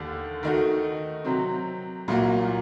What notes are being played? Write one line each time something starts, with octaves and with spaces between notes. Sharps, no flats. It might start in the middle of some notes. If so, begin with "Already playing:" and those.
Already playing: D#2 D3 A3 D4 G4
D#3 A3 D#4 F#4
C3 F#3 C4
C2 A#2 F#3 A#3 F#4